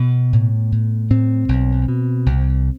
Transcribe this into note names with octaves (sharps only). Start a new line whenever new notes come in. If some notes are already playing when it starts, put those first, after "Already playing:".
Already playing: B2 B3
A2
A2
A2 C4
B1
B2
C2